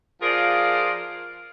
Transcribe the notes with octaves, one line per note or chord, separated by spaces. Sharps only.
F3 F4 G#4 A#4 C5 D5